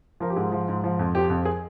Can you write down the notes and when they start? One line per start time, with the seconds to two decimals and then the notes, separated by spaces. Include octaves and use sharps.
0.20 F3 A#4
0.30 G4
0.36 G#2 G#4
0.52 F3
0.69 G#2
0.84 F3
0.99 F2
1.15 F3 G4
1.30 F2
1.45 G#4